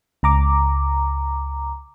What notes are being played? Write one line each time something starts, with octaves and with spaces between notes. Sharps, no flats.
C#2 A#5 D6